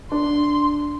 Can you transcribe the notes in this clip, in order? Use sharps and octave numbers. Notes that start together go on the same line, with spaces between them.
D4 C6